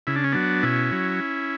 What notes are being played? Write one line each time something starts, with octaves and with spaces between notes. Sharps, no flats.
C#3 E4
D4
C#4
F#3 B3 D4
B2 C#4 E4
F#3